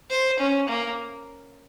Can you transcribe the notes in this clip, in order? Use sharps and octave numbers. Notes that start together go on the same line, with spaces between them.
C5
C#4
A#3